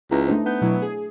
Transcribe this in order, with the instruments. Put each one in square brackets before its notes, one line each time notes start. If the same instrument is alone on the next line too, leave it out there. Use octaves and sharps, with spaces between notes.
[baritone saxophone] C#2 [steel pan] E4 B4 A#5
[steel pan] A3 D4 C5 [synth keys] D#4
[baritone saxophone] B3 [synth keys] G6
[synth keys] B2 F#3 E4
G#4